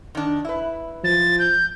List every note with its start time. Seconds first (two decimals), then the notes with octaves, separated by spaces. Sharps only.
0.15 D#3 D4
0.45 E4 B4
1.04 F3 A6
1.39 G6